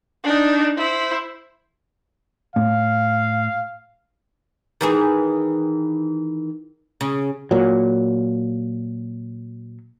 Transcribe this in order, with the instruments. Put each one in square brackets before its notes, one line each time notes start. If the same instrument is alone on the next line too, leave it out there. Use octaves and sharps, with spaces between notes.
[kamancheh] D4 D#4
E4 C5
[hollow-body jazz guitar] A2 [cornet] F5
[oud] D#3 E3 G#4
C#3
[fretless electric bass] A#2 F#3